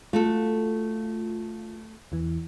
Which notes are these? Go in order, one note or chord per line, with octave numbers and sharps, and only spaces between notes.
A3 F4 F#4 A4
E2 E3